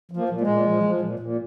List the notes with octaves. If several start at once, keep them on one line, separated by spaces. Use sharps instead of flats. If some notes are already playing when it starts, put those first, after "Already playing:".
F3
A#3
A#2
G#3
A#2
F3
F3
A#2
A#2